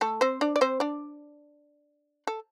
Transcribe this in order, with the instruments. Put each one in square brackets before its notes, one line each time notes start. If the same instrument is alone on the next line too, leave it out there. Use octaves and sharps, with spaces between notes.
[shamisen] A3 A4
C4 C5
D4 D5
D5
C4 C5
D4 D5
A4